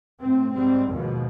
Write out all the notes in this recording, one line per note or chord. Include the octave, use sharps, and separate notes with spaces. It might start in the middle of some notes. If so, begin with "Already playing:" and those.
A2 C4
G#2 G3 C4
D#2 G#2 B2 F3